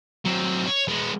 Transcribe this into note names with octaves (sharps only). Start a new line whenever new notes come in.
F#3 C4
C#5
G#3 B3